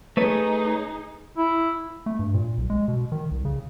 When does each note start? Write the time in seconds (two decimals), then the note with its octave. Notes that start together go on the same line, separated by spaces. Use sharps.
0.17 A3 D#4 G#4 B4 C#5
1.37 E4
2.06 A3
2.19 G2
2.34 A#2
2.58 B1
2.70 G#3
2.88 B2
3.12 D#3
3.31 C2
3.45 C#3